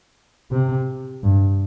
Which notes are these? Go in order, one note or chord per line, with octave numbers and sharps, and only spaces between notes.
C3
G2